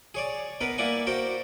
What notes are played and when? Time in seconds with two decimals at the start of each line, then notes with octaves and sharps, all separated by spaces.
0.15 G#4 C#5 D5
0.61 B3 D#4 A#4 B4
0.78 A#3 E4 D5 F#5 G#5
1.07 F#4 A#4 C5 D5 G5